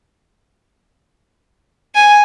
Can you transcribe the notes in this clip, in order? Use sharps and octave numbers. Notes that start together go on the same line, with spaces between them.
G#5